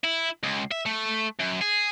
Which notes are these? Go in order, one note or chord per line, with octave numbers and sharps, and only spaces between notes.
E4
C#2
E5
A3
F#2
G#4